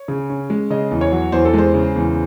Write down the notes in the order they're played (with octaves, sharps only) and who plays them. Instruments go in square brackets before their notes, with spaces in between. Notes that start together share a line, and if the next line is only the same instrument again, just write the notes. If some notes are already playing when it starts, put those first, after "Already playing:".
Already playing: [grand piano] C#5
C#3
C#4
G#3
C#3 D#5
E2
C#5
F#3
E2 C5
A4
G#3 C5
C#3
E2